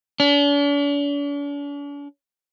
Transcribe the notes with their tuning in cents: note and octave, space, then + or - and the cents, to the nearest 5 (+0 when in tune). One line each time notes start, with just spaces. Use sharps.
D4 -45